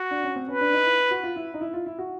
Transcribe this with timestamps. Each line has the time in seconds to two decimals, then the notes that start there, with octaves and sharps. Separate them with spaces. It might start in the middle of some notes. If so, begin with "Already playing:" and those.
Already playing: F#4
0.11 D4
0.23 C#4
0.36 C4
0.48 C#4 B4
0.61 D4
0.73 D#4
0.86 E4
1.11 F#4
1.23 F4
1.36 E4
1.54 D#4
1.61 E4
1.74 F4
1.86 E4
1.99 F#4